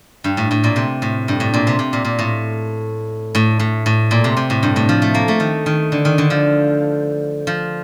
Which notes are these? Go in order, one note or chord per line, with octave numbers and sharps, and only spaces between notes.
G2
A2
A2
A#2
C3
A2
G2
A2
A#2
C3
C3
A#2
A#2
A2
A2
A2
A2
A#2
C3
C3
A2
G2
A2
F3
A3
A#3
A3
D#3
D#3
D3
D#3
D3
F3
F3